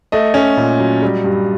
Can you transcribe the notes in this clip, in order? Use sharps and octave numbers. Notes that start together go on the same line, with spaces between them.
A3 D#5
C#4
A#2
F#3
G3
G2